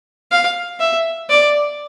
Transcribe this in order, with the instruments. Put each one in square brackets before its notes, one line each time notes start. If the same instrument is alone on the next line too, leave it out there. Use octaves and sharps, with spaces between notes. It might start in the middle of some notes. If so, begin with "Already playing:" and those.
[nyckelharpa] F5
E5
D5